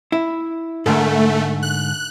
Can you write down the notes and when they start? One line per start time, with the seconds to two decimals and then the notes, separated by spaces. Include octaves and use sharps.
0.12 E4
0.86 G#2 D3 A3 A#4
1.63 F#6